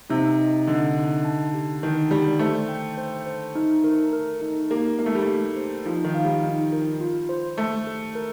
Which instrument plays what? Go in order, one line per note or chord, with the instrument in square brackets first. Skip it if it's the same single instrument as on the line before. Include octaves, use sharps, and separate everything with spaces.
[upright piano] C3 [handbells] D#4
[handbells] D#5
[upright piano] D3 [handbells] D#5
[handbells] D#4
A5
G4
[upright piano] D#3 [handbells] A5
[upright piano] G3 [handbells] D5
[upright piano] A3 [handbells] C5
[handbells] G5
C5
C5
D#4
A#4
A#4
D#4
[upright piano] A#3 [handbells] G4
[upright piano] A#3 [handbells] D#4
[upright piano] A3
G3
A3
[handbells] G4
C5
[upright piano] F3 [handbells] D#4
[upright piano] D#3
[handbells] F5
[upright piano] G3
[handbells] D#4
A#4
F4
C5
[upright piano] A3 [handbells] A4
[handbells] A4
A#4